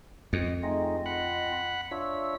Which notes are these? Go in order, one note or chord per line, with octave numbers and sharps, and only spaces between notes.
F2 D#5
A3 C4 D#4 F4 G#4 D#5
F#5 B5 F#6
D4 F4 C#5 E5 E6